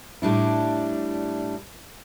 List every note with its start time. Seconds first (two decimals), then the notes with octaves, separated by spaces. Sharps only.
0.22 A2 G3 D4 E4